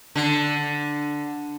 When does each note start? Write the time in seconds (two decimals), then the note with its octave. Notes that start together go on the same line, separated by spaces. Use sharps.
0.15 D3